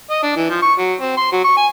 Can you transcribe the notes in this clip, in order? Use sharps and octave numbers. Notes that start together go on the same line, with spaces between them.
D#5
D4
E3
F3
C#6
F#3
C4
C6
F#3
C#6
G#5